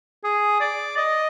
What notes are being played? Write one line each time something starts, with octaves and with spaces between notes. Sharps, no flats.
G#4
D5
D#5